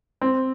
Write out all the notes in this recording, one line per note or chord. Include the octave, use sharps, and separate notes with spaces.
C4